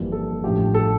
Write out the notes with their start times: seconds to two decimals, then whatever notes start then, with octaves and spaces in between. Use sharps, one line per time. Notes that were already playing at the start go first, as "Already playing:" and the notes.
Already playing: G1 F2 E3 G3 A#3
0.12 A4
0.44 A1 G2 F3 A3 G4
0.74 A4